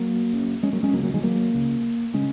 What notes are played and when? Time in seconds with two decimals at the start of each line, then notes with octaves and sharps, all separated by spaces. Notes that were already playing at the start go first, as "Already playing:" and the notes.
Already playing: F#3 A#3
0.33 F#1 F#2 C#3
0.63 G#3 C#4
0.73 F#3 A#3
0.83 G#3 C#4
0.93 C#2 C#3 F#3 A#3
1.03 F#3 A#3
1.14 D#3 G#3
1.23 F#3 A#3
1.54 C#2 C#3
2.14 C#3 G#3 C#4